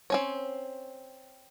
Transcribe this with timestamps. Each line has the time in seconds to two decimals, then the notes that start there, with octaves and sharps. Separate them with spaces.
0.10 C4 C#4 C#5